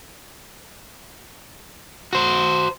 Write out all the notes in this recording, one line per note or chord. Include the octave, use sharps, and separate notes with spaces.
F#4 C5